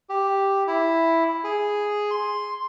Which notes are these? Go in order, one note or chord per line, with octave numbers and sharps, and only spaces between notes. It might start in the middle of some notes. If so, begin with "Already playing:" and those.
G4
E4
G#4
C6